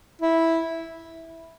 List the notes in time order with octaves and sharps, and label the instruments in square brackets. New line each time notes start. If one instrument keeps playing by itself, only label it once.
[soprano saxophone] E4